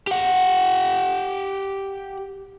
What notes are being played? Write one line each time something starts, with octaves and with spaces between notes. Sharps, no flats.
G4 F#5